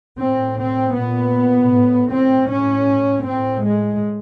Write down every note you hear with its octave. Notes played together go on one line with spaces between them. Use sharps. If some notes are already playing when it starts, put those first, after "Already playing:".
A2 C4
C4
A#2 B3
A2
C4
A2 C#4
A2 C4
G#3